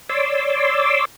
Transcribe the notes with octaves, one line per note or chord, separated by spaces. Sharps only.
C#5 D5 C6 D6 E6